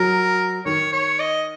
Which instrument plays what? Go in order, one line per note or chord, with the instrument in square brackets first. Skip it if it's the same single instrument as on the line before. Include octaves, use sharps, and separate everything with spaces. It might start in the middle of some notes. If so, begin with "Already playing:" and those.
Already playing: [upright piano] F#3 [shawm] A#4
[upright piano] D#3 [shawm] C#5
[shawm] C#5
D#5